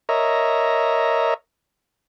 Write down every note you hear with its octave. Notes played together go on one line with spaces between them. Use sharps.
A#4 C#5 D#5 E5 A#5